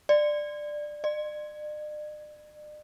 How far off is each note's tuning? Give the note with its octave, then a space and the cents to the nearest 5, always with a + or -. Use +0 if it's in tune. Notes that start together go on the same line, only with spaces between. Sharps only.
D5 +15
D5 +45